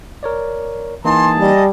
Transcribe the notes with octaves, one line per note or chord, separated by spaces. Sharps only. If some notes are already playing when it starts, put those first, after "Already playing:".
A#4 C#5 D5
E3 A#3 D#4 G#4 G#5 A5 C6
G3 D#5